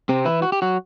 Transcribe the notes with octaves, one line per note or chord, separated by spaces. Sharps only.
C3 C4
E3 E4
F#4
G4
F#3 F#4